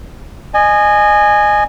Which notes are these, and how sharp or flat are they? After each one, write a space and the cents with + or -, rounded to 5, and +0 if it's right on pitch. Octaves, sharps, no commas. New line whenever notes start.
D#5 -30 G#5 +0